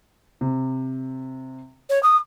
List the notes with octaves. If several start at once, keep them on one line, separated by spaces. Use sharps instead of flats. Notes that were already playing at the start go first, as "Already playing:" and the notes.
C3
C#5
D#6